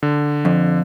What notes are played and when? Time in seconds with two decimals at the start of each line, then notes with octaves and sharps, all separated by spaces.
0.03 D3
0.45 F2